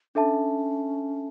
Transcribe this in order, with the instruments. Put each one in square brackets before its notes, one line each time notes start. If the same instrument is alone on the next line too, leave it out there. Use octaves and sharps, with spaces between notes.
[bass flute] C#4 [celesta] D4 A4 E5 A5